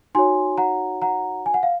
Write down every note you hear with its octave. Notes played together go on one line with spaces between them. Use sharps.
D#4 F#4 C#5 G#5 C6
F#5 A#5
F#5 A#5
G#5
F#5
F5